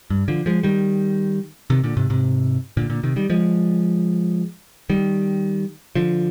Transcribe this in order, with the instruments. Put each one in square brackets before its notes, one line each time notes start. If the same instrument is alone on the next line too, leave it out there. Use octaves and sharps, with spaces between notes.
[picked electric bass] G2
D3 F3
F3 G#3
D#3 G3
C3 D#3
A#2 D3
G#2 C3
G#2 C3
A#2 D3
A#2 D3
C3 D#3
D#3 G3
F3 G#3
D#3 G3
D3 F3